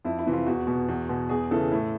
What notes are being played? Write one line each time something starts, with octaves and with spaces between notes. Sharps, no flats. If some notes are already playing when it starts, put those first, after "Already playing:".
F2 E4
E4
C3 E3
F4
E2 F#4
B2
E2
B2
E2 G#4
C#3 E3 A4
A2